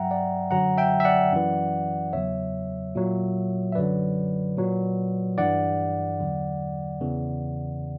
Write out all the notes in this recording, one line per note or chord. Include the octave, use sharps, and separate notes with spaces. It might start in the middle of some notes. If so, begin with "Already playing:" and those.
Already playing: G2 F#3 E5 F#5 G5 A#5
D5 F#5
F#2 D3 F#3 F#5 A#5
E5 G5
E5
D5 F#5
F#2 E3
E2 C#3 F#3 C#5 E5
A#2 F#3
E5
F#2 D3 F#3 B4 D5
A#2 F#3
G2 E3 D5 F#5
E2 D3 F#3
E2 C#3 E3